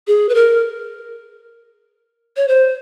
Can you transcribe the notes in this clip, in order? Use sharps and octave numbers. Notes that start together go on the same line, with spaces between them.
G#4
B4
A#4
C#5
C5